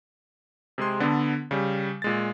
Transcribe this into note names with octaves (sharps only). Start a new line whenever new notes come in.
C3 G#3 G#4 C6
D3 B3 D4 A4
C#3 G3
A#2 G#3 A6